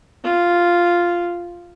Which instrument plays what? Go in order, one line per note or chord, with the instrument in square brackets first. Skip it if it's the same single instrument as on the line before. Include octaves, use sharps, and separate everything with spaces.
[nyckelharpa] F4